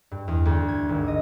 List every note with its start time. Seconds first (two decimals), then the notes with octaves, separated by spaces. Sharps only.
0.11 G2
0.28 E2
0.46 D2
0.68 G#6
0.89 G#1
1.08 D#5